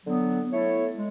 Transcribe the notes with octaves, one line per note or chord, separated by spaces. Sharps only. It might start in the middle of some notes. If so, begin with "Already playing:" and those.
D3 F#3 B3
A3 E4 A4 C#5
G#3